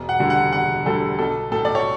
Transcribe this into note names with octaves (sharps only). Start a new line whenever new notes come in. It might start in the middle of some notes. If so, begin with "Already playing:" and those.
Already playing: E1
F#5
D2 D3 G3
F#5
E1 F#5
D2 D3 G3 A4
B1 A4
A2 F#3 A4
D5
C#5